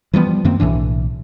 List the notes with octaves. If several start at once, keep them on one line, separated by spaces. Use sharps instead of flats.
E3 F3 G3 B3
F#2 D#3 A#3 C4
B1 A2 E3 D4